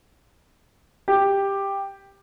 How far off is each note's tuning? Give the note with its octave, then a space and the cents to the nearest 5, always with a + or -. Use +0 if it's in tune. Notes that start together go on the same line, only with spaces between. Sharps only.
G4 +10